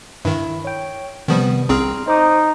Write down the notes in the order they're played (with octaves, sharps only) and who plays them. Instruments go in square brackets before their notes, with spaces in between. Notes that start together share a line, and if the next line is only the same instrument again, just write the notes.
[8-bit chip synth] G2 D#3 [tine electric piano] E4
[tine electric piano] C#5 G5
[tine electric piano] C3 B3 D#6 [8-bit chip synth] D#3 F3 G3
[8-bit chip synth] C2 C4 G#4 [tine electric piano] A#5 C6 F6
[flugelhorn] D#4 [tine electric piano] C5 D6 D#6